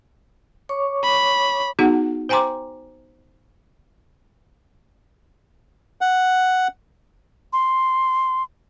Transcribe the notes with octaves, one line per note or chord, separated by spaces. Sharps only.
C#5 C#6 D6
B5
B3 D#4 F#4 G#4 F#5
C5 G5 G#5 A#5 C6 D6
F#5
C6